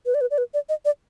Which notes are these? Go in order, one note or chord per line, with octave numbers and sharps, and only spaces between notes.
B4
D5
B4
D5
B4
D5
D#5
D5